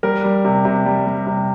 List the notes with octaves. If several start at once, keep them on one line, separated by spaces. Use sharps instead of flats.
G3 A#4
G3
C3
C3
G3
G3
C3